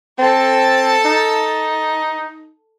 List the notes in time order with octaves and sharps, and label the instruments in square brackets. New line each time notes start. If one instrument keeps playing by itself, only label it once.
[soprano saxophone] C4 [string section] A4 A5
[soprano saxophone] D#4